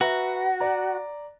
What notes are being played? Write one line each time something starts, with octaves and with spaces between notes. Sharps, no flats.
F#4 B4 E5 A#5
D5 A#5